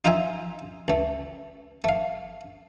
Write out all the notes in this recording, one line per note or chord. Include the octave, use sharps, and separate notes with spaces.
D#4 F4 A#4 C5 E5 G#5
C#2 A3
A3 F5